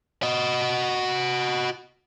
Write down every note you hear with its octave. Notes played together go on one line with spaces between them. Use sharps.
F#4 D#5